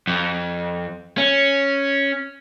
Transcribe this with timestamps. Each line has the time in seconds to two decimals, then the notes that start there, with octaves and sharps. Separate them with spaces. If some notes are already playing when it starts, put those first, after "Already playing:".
0.07 F2
1.18 C#4